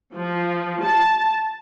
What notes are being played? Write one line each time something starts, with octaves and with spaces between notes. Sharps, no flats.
F3
A5